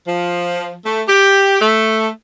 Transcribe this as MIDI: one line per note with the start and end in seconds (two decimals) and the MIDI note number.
0.07 0.73 53
0.84 1.02 57
1.07 1.59 67
1.60 2.08 57